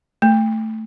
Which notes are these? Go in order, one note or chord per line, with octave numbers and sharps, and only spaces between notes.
A3